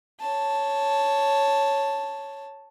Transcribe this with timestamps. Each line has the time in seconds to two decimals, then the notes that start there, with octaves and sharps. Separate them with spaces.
0.20 C#5 A5